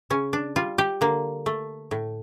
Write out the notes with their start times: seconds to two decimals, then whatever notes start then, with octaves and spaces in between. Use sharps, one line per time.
0.10 C#3 C#4
0.33 D4
0.56 G3 F4
0.78 G4
1.01 D3 A#3
1.46 A3
1.91 A2